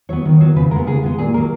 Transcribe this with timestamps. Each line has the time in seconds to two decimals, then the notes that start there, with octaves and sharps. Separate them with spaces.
0.09 F#3 B3 C#5
0.25 D#3
0.41 F#3 B3
0.56 C#3 B4
0.71 G#3 B3 A#4
0.87 C#3 G#4
1.03 G#3 B3
1.18 A#2 G#4
1.34 A#3 A#4
1.37 F#3